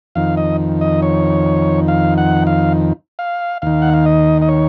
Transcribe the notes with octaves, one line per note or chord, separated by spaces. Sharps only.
F2 D#3 F5
D#5
D#5
C#5
F5
F#5
F5
F5
D#2 D#3 F5
F#5
F5
D#5
D#5
C#5